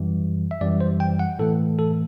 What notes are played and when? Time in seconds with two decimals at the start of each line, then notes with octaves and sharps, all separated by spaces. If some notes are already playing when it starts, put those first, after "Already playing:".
Already playing: F#2 E3 G3
0.51 E5
0.61 F#2 E3 G3 D5
0.81 C5
1.00 G5
1.19 F#5
1.39 A2 E3 A3 A4
1.79 A4